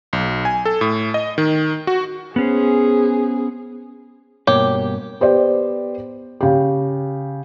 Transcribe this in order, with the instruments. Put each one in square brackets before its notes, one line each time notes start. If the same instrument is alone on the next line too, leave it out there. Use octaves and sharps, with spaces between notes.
[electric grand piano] B1
G#5
A4
A2
D#5
D#3
F#4
[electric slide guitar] B3 C#4 C5 [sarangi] G#4
[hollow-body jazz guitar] G2 B2 A#3 [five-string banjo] G4 [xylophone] C#5
[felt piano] B3 G4 C5 D5
C#3 G4